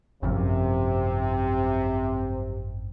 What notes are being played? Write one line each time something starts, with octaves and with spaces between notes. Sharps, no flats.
G#1 F#2 C3 F3